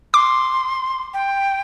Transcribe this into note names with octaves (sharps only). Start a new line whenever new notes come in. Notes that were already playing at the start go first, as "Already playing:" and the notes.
C6 D6
G5